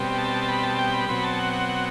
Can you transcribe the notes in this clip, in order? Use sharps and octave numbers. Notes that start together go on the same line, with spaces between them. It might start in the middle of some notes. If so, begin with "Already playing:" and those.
Already playing: B2 G3 C4
A5
B5
A5
G5
B5
B2 F#3 C4 B5
A5
F#5
F#5
F#5